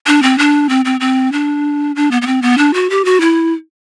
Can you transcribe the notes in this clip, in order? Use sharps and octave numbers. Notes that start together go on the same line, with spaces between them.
D4
C4
D4
C4
C4
C4
D4
D4
B3
B3
C4
B3
D4
F#4
G4
F#4
E4